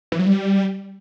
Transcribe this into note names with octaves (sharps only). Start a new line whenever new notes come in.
E3
F#3
G3